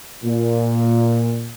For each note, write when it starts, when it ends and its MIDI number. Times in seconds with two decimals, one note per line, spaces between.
0.24 1.53 46